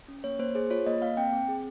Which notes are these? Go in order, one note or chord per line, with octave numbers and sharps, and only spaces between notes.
C#4
A#3 C#5
A#3 C5
G#4 C5
F4 C#5
A#3 D#5
A#3 F5
C4 G5
C4
G#4